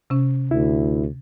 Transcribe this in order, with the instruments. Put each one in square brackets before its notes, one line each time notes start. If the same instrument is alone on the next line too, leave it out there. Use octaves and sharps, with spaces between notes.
[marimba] C3 C#4
[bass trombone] D2 [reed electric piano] E4